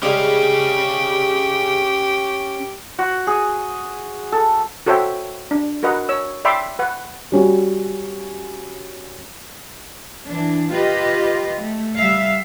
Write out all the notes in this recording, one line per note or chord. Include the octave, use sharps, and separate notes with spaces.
C#3 G3 G#3 C#4 G4 F5
F#4
G#4
A4
F#4 A4 C5 C#5 E5 G5
D4
F#4 A#4 B4 D#5 F#5
C#5 E6
D5 E5 G5 B5 C6 D6
B4 F#5
G3 C#4 F#4
E3 D4
F4 G4 B4 D#5
A3
G3 E5 F5